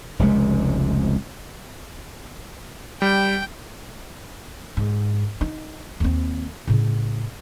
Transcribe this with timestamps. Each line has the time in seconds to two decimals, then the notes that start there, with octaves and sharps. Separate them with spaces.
0.19 F1 C#2 C3 G#3
3.02 G3 G5
4.77 G#2
5.41 D#4
6.00 D#2 C4
6.68 A2 C#3